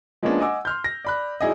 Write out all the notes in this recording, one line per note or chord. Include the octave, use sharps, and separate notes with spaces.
F3 G#3 A#3 B3 C#4 D4
D#5 F#5 G#5 D6 E6
C6 F6 G6
A#6
D5 B5 F#6
F#3 D#4 E4 G#4 D5 D#5